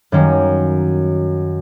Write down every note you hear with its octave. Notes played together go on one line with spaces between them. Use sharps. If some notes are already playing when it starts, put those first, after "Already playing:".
F#2 D#3 G3 A#3 C#4